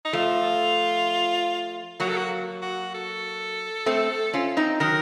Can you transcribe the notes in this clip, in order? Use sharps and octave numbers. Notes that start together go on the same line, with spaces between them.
D#4
F3 A3 F4
F#3 A#3 F#4
A4
F#4
F#4
A4
A3 C4
C#4 F4
C4 D#4
D#3 F#3 A#4